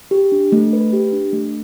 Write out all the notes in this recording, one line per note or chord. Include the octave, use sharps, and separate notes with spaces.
G4
D4
A3
B4
G4
D4
A3